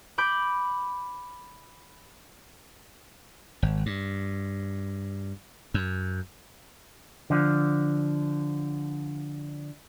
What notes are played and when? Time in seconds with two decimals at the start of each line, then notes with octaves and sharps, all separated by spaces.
0.18 B5 D6 G6
3.63 G#1
3.86 G2
5.74 F#2
7.30 D3 F3